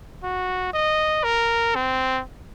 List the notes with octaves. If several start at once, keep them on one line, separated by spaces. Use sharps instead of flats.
F#4
D#5
A#4
C4